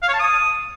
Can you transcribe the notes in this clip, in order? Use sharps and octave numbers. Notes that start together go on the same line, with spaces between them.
F5
C#5
A5
D#6